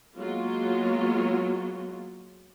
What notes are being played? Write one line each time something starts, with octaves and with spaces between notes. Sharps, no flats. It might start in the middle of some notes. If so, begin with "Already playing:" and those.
F#3 G#3 A#3 B3 F4 F#4